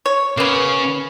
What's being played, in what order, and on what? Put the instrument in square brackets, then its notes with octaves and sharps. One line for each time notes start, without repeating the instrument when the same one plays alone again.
[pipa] C#5
[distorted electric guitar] C#3 [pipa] A#3 B3